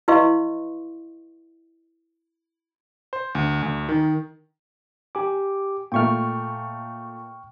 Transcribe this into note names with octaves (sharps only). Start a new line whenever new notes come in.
E4 B4 D#5 F5 C6 C#6
C5
D2
D2
D#3
G4 G#5 D6
A#2 A3 G5 C#6 F6